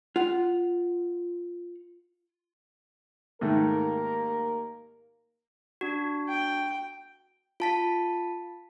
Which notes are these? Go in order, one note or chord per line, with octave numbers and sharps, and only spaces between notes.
F4 F#5
D#2 G#2 D#3 A3 A#3 A#4
D4 F#4
G5
F4 A5 B6